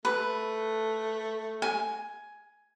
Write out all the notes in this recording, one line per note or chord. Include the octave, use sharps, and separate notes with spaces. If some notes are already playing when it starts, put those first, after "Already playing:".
A3 B4
G#5